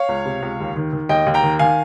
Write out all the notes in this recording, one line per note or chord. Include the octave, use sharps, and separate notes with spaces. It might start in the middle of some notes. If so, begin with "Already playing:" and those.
Already playing: C#5 F5
C#2
C3
C#2
D#2
D#3
D#3
D#2 D#5 G5
D#2
G5 A#5
D#3
D#3 F5 G#5